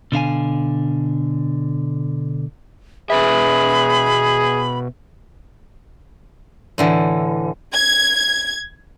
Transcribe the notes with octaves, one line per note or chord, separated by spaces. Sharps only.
B2 D3 F5 G#5
B2 G#4 B4 E5 B5
A2 D3 E3
G#6